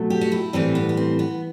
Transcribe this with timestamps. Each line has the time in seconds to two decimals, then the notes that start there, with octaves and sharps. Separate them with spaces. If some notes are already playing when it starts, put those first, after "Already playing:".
Already playing: B2 F#3 A3
0.10 G4
0.21 F#4
0.32 E4
0.53 A2 E3 G3 C4
0.75 B3
0.89 B3
0.97 C4
1.19 B3